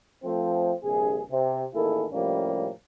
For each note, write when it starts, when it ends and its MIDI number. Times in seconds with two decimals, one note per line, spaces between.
0.24 0.72 53
0.24 0.72 57
0.24 0.72 60
0.84 1.21 34
0.84 1.21 43
0.84 1.21 48
0.84 1.21 68
1.31 1.64 48
1.74 2.05 33
1.74 2.05 51
1.74 2.05 58
1.74 2.05 64
1.74 2.05 68
1.74 2.05 69
2.12 2.68 45
2.12 2.68 48
2.12 2.68 53
2.12 2.68 55
2.12 2.68 58
2.12 2.68 61